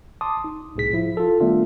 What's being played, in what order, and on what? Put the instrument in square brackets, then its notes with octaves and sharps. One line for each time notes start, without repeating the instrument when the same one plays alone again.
[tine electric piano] A5 C6 D6 D#6
D#4
C2 A2 G#4 B6
F3 E4
F4 A4
D#3 G3 A3 B3 D4 F4